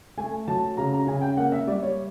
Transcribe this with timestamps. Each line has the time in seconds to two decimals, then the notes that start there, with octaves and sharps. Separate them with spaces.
0.17 A3 G#5
0.48 F#3 A5
0.77 C#3 A#5
0.93 A#5
1.07 C#3 G#5
1.22 G5
1.37 A#3 F#5
1.52 E5
1.67 G3 D5
1.83 C#5